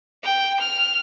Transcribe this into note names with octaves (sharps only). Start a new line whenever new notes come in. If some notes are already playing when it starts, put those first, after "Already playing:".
G5
F6